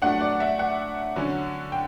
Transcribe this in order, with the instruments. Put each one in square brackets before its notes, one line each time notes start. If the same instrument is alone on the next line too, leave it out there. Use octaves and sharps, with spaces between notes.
[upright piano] F#3 A3 D4 [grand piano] F#5
[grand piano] D5
E5
F#5
[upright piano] D3 F#3 C#4
[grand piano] G5